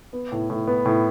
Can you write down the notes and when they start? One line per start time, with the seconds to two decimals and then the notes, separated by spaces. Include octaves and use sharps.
0.13 B3
0.32 A2
0.50 A2
0.67 B3
0.85 A2